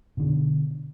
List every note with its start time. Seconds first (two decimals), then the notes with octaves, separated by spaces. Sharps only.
0.17 B2 D3